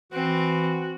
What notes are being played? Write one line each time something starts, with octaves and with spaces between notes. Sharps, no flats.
E3 C4 F#4